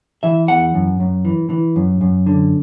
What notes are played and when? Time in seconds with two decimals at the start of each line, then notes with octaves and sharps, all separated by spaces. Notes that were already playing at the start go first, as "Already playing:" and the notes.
0.23 E3 E5
0.48 E2 F#5
0.74 F#2
1.00 F#2
1.25 E3
1.50 E3
1.76 F#2
2.01 F#2
2.26 D3